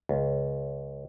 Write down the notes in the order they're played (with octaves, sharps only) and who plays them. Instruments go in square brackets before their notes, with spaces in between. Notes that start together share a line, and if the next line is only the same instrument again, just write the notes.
[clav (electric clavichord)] C#2